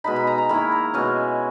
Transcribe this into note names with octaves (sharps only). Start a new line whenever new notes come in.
B2 G#3 D#4 B5
B5
A#5
A#5
D#3 A#3 E4 B5
A#5
B2 G#3 C#4 G#5